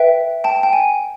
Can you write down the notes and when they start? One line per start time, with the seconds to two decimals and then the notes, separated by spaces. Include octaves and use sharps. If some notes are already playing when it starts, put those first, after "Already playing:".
Already playing: B4 E5 G5
0.44 G5 A5
0.63 G5
0.73 G#5